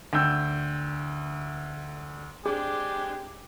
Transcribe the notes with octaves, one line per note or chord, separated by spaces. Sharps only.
D2 G5 E6 G6
G#3 C4 D4 G4 G#4